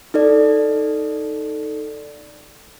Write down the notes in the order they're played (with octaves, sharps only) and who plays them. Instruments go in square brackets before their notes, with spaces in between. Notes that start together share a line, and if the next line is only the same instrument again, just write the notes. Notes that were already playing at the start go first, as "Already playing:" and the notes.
[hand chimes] D#4 A4 D5